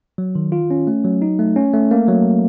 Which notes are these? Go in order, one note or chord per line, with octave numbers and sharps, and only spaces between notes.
F#3
D#3
F4
C#4
A3
F#3
D#4
A3
C#4
A3
A#3
F#3